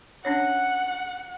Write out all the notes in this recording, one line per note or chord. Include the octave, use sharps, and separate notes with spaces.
C#4 D4 C#5 F#5